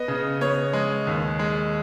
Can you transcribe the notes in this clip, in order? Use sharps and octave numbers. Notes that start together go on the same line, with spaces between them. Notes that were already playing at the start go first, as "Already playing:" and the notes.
Already playing: B3 D#5
C#3
B3 C#5
G#3
D#2
G#3